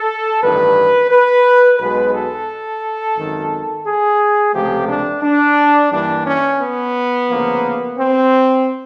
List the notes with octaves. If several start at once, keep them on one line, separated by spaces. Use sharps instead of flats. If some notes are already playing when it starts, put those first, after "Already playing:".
Already playing: A4
A1 G2 D#3 B4
B4
B1 B2 G#3 B4
A4
G#1 F#2 D#3
G#4
C#2 C3 F3 A3 G4
D4
D4
G2 E3 G3 A#3 D4
C#4
B3
D2 C#3 F3 A#3
C4